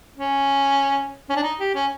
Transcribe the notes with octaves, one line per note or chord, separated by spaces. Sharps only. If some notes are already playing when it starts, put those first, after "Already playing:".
C#4
C#4
D4
D#4
G4
C#4